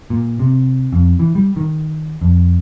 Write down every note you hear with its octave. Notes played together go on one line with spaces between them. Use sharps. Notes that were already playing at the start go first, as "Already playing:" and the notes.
A#2
C3
F2
E3
G3
D#3
F2